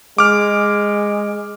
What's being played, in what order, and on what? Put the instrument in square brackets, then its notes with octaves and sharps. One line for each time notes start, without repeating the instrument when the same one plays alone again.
[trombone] G#3 [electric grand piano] D6 F6